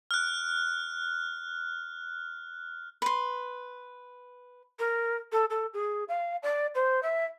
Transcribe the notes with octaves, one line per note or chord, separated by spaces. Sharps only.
F6 F#6
B4 C6
A#4
A4
A4
G#4
F5
D5
C5
E5